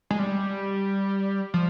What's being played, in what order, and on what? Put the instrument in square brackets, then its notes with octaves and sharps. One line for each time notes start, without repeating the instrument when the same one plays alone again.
[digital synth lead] G#3
G3
F3